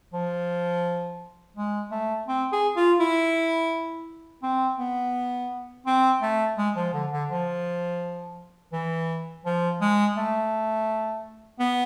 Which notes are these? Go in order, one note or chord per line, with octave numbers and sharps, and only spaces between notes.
F3
G#3
A3
C4
G#4
F4
E4
C4
B3
C4
A3
G#3
F3
D3
D3
F3
E3
F3
G#3
A3
B3